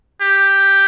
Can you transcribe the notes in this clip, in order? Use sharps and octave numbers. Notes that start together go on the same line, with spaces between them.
G4